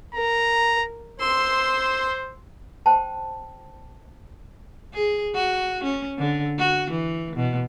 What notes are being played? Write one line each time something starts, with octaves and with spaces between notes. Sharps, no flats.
A#4 A#5
C5 C6 E6
C5 G5 A5
G#4
F#4
C#4
D3
F#4
E3
B2